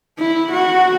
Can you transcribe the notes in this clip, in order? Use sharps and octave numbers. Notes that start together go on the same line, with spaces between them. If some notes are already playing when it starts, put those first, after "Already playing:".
E4
F#4